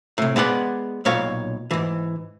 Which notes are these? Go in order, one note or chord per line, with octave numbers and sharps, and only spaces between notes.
A2 C3
G#3 B3 D5 F#5
B1 A#2 C#5 F5
G#2 E3